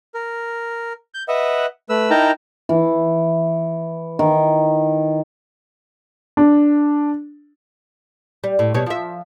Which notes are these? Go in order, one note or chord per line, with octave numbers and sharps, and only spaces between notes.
A#4
G6
B4 D#5 E5 F#5
A3 B4 E6
D#4 E4 A#4 G5 A5 A#5
E3
D#3
D4
G3
A2
B2 G3 C#5
F3 E5